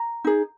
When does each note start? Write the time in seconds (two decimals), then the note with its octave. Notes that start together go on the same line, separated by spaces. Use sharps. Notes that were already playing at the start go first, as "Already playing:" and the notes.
Already playing: A#5
0.25 D#4 G#4